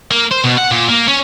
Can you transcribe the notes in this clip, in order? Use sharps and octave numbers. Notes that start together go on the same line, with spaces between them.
A#3
C5
B2
F#5
A#2
A#3
C#4